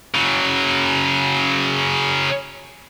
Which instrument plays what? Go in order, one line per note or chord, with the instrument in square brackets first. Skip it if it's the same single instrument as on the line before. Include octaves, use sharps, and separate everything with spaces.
[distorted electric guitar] C#3 F#3